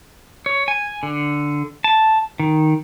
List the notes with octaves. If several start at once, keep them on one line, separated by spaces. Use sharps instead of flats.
C#5
G#5
D3
A5
D#3